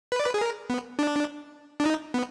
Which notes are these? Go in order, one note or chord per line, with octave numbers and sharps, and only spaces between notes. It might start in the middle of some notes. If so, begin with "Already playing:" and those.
B4
D5
B4
G#4
A#4
B3
D4
D4
D#4
B3